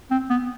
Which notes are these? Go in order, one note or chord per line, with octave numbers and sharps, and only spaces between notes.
C4
B3